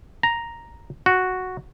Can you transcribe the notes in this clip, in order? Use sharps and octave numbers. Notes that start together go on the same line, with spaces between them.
A#5
F#4